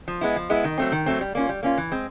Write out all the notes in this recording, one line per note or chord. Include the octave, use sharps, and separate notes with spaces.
F3
G#3 B3 E4
F3
G#3 B3 E4
D#3
F#3 A3 C4
D#3
F#3 A3 C4
G3
A#3 C#4 F4
G3
A#3 C#4 F4
E3
G#3 C4